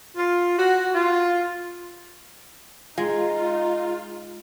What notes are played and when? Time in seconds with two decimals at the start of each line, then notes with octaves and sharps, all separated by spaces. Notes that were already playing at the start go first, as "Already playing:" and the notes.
0.16 F4
0.58 F#4
0.94 F4
2.98 G#3 D#4 F4